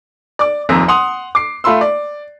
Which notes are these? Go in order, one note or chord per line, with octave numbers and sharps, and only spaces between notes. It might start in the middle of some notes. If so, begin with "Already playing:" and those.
D5 D6
D#1 G#1 F2 C4 A#5 E6
F#5 C6 D#6 F7
D6 C7
A3 F4 B5 C6 E6
D5